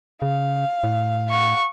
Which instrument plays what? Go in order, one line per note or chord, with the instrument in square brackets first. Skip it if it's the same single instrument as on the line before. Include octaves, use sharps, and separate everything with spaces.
[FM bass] C#3 [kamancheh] F5
[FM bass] A2
[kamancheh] F5 F#5 [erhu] C#6